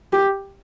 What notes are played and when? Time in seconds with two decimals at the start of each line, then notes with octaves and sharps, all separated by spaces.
0.13 G4